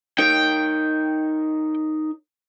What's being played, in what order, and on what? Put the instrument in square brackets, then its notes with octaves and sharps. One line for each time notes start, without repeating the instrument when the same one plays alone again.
[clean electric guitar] D#4 A#4 C#5 [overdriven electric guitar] G5